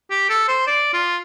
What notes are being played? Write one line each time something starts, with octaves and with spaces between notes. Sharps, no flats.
G4
A4
C5
D5
F4